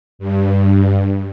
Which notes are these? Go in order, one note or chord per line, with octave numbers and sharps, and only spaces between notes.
G2